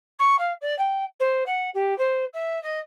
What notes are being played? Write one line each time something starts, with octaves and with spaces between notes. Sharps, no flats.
C#6
F5
D5
G5
C5
F#5
G4
C5
E5
D#5